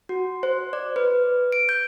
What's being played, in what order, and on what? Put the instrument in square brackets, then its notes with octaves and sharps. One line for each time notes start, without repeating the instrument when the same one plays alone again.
[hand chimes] F#4
C5
D5
B4
D7
G6